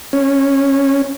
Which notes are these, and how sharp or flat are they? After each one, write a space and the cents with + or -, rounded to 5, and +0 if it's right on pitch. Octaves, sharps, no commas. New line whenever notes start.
C#4 -10